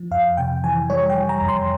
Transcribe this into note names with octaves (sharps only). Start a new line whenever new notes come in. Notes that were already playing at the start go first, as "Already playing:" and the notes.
Already playing: F3
F2 F5
C3 G5
E3 G#5
G3 C#5
G5
G3
A#5
F2
C6